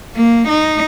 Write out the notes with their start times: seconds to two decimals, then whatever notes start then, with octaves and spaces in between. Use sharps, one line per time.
0.16 A#3
0.49 D#4